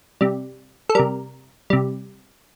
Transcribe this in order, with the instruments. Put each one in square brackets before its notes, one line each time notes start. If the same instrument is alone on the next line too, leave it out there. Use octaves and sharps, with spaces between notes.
[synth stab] C3 G3
A4
C3 G3 A#4
C3 G3